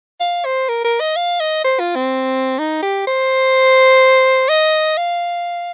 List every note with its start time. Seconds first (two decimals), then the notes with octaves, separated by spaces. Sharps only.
0.20 F5
0.45 C5
0.69 A#4
0.84 A#4
1.00 D#5
1.16 F5
1.40 D#5
1.64 C5
1.80 F4
1.96 C4
2.59 D#4
2.83 G4
3.07 C5
4.49 D#5
4.97 F5